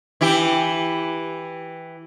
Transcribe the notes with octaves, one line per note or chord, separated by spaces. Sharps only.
E3 E4 G4